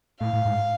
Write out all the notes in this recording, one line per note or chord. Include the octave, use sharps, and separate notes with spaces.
A2 F5
A2
G#2